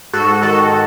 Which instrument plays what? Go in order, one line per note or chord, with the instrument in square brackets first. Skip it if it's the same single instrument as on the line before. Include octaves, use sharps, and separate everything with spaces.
[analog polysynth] G#2 F#4 A4
D#3 F#4 A4